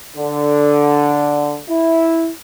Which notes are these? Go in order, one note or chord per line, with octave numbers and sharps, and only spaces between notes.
D3
E4